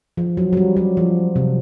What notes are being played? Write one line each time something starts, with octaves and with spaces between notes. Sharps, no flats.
F3
F#3
F#3
G3
F#3
F3
C3